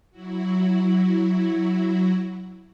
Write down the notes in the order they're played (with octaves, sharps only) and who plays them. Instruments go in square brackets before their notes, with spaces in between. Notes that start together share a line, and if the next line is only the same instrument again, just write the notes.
[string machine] F#3 E4 F#4